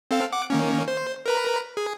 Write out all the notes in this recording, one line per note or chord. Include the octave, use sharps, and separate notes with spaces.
C4 A4 F5
F#5 D6
D#3 A#3 C#4
C5
A#4 B4 A#5
G#4